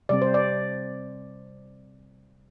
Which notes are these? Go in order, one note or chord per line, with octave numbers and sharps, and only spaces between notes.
C3 G3 C4 D5
C5
D5